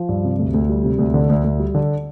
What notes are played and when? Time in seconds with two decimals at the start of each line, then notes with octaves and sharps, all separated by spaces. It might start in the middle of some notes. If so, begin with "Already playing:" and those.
Already playing: F3
0.09 G2
0.24 C3
0.39 D2
0.54 D2
0.69 G3
0.84 C3
0.99 D2
1.14 D3
1.29 D2
1.44 D2
1.60 G3
1.75 D3